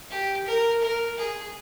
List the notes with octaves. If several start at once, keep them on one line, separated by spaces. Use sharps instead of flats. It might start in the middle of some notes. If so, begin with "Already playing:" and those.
G4
A#4
A#4
G#4